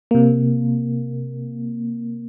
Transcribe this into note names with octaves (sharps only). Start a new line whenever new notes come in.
C3 A#3